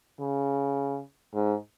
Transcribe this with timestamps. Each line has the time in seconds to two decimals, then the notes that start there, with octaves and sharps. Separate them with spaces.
0.20 C#3
1.34 G#2